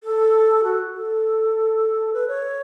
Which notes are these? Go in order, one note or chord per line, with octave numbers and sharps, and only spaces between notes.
A4
F#4
A4
B4
C#5